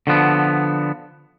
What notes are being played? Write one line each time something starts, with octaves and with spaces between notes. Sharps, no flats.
D3 F3 B3